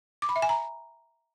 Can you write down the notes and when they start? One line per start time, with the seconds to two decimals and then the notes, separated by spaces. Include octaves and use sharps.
0.22 D6
0.29 B5
0.36 E5
0.42 G#5
0.49 A#5